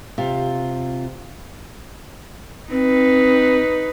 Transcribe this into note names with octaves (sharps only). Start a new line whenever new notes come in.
C3 F4
C4 D#4 B4